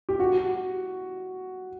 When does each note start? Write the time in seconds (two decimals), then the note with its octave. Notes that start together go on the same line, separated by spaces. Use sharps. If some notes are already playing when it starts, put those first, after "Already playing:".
0.09 G4
0.20 F#4